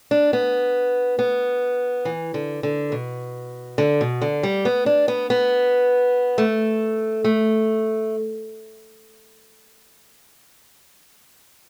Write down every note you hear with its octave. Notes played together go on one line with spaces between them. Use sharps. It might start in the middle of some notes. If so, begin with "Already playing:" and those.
D4
B3
B3
E3
D3
D3
B2
D3
B2
D3
G3
B3
D4
B3
B3
A3
A3